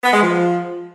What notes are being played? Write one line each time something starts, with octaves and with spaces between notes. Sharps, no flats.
B3
G#3
F3